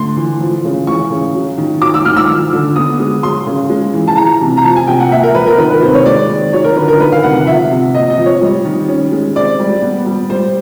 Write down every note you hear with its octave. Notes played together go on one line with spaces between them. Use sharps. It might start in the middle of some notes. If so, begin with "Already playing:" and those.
Already playing: D3 A3 C6
E3
F3
C#3
E3 C#6
C#3
F#3
D#3
F#3 D6
E6
D#3 F6
E6
F3
D3
B3 D#6
G#3
F#3 C6
C#3
G#3
E3
A5
E3 A#5
C3
A#5
F3 A5
G#5
C3 G5
F#5
A#3 E5
A#4
F3 B4
A#4
D#3 B4
B4
C3 C5
C#5
G#3 D5
D#3
F#3 C#5
A#4
D3 B4
A#4
D#3 B4
F5
C3 F#5
F#5
F3 E5
C3
A#3 D#5
D#5
F3
C#5
G3
D#3
C#4
G#3
C4 D5
G3
B3
G3
G3 C5